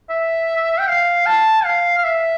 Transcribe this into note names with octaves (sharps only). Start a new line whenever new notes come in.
E5
G5
F5
A5
F5
F5
E5